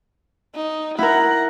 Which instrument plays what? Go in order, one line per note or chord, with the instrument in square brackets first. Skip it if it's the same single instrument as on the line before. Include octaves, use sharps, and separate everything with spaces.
[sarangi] D#4
[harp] E4 A#4 [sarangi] F#5